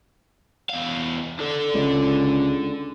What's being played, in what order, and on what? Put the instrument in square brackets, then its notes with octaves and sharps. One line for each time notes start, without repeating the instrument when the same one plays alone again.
[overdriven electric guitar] E2 F5
D4 A4
[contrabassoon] C#2